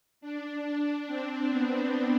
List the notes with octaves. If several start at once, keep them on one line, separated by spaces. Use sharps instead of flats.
D4
D4
C4
B3